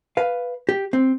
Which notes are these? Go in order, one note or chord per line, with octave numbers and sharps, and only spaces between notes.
B4 F5
G4
C4